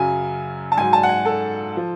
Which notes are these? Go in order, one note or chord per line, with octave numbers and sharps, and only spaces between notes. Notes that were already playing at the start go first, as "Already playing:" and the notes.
Already playing: F#2 C#3 F#3 G#5
A5
G#2 F#3 G#5
A5
F#5
G#5
A4
F3